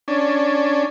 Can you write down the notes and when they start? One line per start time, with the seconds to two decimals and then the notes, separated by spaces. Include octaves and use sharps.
0.08 C#4 D4